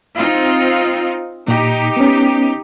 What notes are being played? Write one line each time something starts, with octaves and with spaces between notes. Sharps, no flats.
C4 D#4 F4
A#2 D#4 G4
B3 C#4